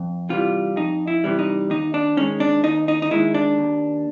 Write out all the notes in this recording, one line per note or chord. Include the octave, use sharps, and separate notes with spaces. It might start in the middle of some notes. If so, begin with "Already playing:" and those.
Already playing: F2
C3 E3 G3 F4
F2 D#4
E4
C3 E3 G3
D#4
D#2 D#4
D4
D#3 G#3 C#4
D4
D#2 D#4
D#4
D#4
D#3 G#3 E4
D4
D#2